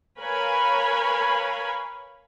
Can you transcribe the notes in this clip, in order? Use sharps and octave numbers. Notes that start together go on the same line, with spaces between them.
A#4 B4 C#5 F5 G#5 B5